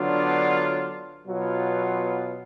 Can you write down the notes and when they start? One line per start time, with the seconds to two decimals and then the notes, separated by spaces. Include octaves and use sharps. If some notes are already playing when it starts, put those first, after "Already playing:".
Already playing: D3 F#3 B3 D4 F4
1.26 B2 F#3 B3 F4